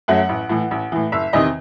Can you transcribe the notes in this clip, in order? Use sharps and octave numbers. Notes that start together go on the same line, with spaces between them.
F#2 F#3 A3 F#5
A1
A2 E3
A1
A2 E3
F#1 E5
E2 C3 D#3 D#5